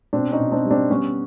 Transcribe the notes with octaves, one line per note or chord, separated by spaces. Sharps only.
B2 C4 D4
C#4 D#4
B2
C4 D4
G3
C4 D4
G3 B3 C#4